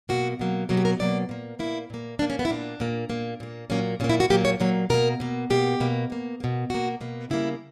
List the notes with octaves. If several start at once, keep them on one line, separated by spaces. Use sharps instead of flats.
B2 F#3 A#3 F#4
B2 F#3 A#3
B2 F#3 A#3 A#4
G4
A#4
B2 F#3 A#3 D5
A#2 A#3
A#2 A#3 E4
A#2 A#3
A#2 A#3 D4
C#4
B3
E4
A#2 A#3 D4
A#2 A#3
A#2 A#3
A#2 A#3
A#2 F#3 A#3 C#4
A#2 F#3 A#3 C#4
E4
F#4
A#2 F#3 A#3 G4
C#5
A#2 F#3 A#3 C#5
B2 A#3 A#4
B2 A#3
B2 A#3 G4
B2 A#3
B2 A#3
B2 A#3
B2 A#3 F#4
B2 A#3
C#3 G3 A#3 E4